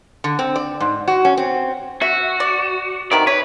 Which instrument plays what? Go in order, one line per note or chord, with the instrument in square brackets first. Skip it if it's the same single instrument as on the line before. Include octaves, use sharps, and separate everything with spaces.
[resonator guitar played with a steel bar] D3
C4
D5
G#2
F#4
C#4
C4
[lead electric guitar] F#4 [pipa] E5
[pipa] D5
[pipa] C3 D#3 B3 [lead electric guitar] D5
[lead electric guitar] B4 [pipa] C#5